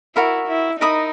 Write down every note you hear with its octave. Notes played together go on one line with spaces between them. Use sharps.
E4 F#4 A#4 E5 B5
E4
D#4 A#4 E5 B5 D#6